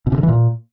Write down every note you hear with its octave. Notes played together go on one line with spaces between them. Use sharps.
B2
C3
D3
E3
A#2